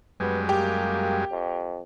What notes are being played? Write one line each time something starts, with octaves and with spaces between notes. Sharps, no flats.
F#2 G3 G#3 B3
A#3 G4
F2